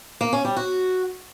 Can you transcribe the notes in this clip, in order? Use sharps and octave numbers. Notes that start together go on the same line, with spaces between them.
A#3
C#4
G3
F#4